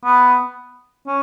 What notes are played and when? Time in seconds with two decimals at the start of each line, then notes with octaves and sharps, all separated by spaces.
0.05 B3
1.07 C#4